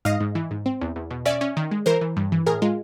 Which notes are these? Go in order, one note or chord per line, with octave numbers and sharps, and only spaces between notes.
G#2 D#5 F5
G#2
E3
G#2
C4
E2
E2
B2
C#4 D5 E5
C#4
D#3
G#3
E3 A#4 C5
E3
G2
E3
A2 G#4 A#4
G#3 F4